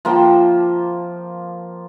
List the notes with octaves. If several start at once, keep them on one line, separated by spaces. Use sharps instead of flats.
F3 A#3 G5 A5